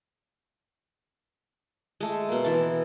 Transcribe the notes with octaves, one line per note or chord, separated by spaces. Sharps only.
G#3 A3
B2 A#3
E3 A5